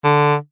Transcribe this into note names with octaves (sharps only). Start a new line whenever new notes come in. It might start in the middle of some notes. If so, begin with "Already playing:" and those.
D3